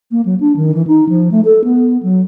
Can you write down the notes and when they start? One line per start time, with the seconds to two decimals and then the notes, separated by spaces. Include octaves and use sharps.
0.11 A#3
0.25 F#3
0.40 D4
0.56 D#3
0.74 E3
0.87 D#4
1.09 F3
1.31 A3
1.45 A4
1.64 B3
2.03 F#3